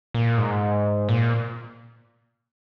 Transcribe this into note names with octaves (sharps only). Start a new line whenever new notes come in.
A#2
G#2
A#2